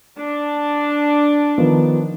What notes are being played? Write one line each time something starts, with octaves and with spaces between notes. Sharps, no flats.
D4
D#3 F3 B3